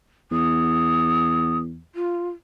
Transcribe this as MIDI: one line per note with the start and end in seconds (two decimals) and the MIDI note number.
0.31 1.80 40
0.31 1.57 87
1.95 2.28 65